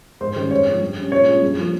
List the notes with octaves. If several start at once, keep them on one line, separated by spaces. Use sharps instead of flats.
G#2 C5
D#3 G3 C#4
G#2 C#5
F3 C4
G2
G3 C#4
A#2 C#5
G#3 C#4 F4
G2
F3 A#3